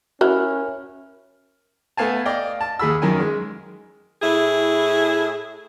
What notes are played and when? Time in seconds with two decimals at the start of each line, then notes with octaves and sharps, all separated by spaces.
0.21 C#4 E4 F#4 A#4 F6
1.97 A3 B3 F5 G#5 A5
2.26 D5 D#5 F5 G5
2.61 A5
2.79 D#2 G#4 B5 E6
3.02 F#2 D#3 A#4 G#5
3.20 G#3
4.22 A2 E4 G#4